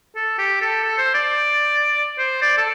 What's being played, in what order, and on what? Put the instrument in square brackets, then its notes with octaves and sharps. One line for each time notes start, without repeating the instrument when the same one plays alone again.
[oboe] A4
G4
A4
A4
C5
D5
C5
D5
A4